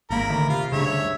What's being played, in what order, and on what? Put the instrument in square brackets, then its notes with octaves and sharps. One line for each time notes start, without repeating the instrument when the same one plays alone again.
[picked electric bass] G#1 A#3 [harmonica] A#4 B5
[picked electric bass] D3 D#3 A3
[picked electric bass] C3 [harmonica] F4
[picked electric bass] D2 G2 C#3 [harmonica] C#5 E5